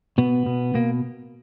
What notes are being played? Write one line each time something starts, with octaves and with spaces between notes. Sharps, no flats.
B2 B3
B2
B2 A#3